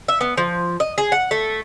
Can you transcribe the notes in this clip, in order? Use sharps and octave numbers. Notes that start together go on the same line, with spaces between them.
E5
B3
F3
D#5
G#4
F#5
A3